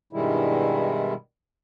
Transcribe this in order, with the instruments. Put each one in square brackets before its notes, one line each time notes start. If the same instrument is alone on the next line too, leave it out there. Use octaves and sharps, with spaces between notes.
[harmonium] G2 B2 D#3 G3 G#3 E4